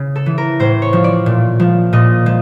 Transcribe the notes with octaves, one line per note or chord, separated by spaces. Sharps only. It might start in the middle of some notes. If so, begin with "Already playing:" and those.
Already playing: C#3
A4
E3
A#4
A2 C5
C#5
F3
D5
A#2
F3
A#2 D#5
F3